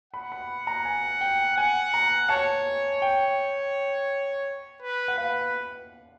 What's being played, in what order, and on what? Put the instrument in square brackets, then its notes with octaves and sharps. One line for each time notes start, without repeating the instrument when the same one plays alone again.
[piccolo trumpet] F#5 [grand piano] B5
[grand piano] B5
A#5
G#5
G5
[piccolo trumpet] F#5 [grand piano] G#5
[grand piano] A#5
[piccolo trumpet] C#5 [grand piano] A5
[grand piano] G5
[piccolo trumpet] B4
[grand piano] F#5
[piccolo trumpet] B4 [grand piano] F5